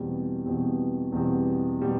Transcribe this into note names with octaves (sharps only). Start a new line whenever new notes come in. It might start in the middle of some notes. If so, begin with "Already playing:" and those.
Already playing: E2 B2 G3 C4
E2 B2 G3 C4
E2 B2 G3 C4
B2 G3 C4